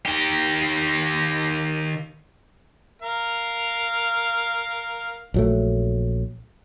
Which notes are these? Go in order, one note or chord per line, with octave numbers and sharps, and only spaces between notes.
D#3 G4
A#4 F5
A#1 F#3 A3